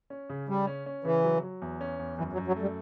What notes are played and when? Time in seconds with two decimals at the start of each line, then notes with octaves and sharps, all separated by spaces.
0.10 C#4
0.30 C#3
0.48 C#3 G3
0.67 C#4
0.86 C#4
1.04 C#3 E3
1.24 F#3
1.43 F#3
1.62 E2
1.81 C#4
1.99 E2
2.18 F#2 E3
2.33 F#3
2.38 F#2
2.47 F#3
2.56 A3
2.62 G3